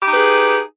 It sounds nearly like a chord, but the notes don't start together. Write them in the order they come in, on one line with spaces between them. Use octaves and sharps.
G4 D#4 B4 G#4